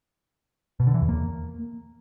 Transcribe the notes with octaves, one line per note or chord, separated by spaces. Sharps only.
B2
D3
E3
E2
A#3